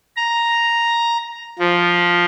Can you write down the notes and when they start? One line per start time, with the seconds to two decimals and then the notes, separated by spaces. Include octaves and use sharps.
0.17 A#5
1.59 F3